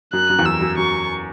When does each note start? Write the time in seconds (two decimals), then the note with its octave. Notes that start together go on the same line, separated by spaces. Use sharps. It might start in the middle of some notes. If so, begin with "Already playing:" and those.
0.13 F#2 F#6
0.29 F#2
0.39 E2
0.45 F#2 E6
0.61 F#2
0.77 F#2 C#6